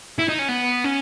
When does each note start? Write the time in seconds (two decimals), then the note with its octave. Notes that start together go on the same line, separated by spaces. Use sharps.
0.18 E4
0.29 D#4
0.39 C#4
0.49 B3
0.84 C#4